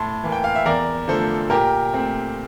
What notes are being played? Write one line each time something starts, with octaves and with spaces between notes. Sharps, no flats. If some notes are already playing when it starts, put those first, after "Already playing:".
Already playing: A2 A5 C6
E3 A#3
G5
F5
E5
E2 A#4 D5
D3 F3 A3 A4 C5
A#2 G4 A#4
A3 C4